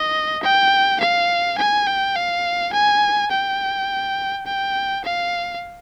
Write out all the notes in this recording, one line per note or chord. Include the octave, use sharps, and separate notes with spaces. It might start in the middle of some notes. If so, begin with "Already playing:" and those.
Already playing: D#5
G5
F5
G#5
G5
F5
G#5
G5
G5
F5